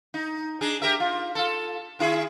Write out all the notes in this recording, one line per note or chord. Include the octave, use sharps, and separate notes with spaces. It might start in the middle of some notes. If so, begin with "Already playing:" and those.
D#4
D4 D#4 G#4
G4 A#4 E5
F4
F4 A4
D#3 E4 G#4